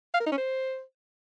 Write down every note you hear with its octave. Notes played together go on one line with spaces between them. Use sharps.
F5
A#4
D#4
C#4
C5